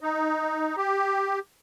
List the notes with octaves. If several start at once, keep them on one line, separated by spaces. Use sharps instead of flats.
D#4
G4